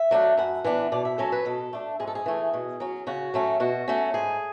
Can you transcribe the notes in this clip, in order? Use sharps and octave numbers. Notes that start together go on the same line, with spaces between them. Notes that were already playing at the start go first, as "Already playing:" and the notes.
Already playing: E5
F#3 A3 D4
F#2 F#5
E3 B3 D4
B2 D5
E5
F#3 C#4 A4
B4
B2 A4
A3 D4
G#2 G#4
A4
G#4
E3 A3
B2
F#3 C#4
C#3 F#4
F#3 A3 C#4
B2 F#4
A3 C#4
G#2 G#4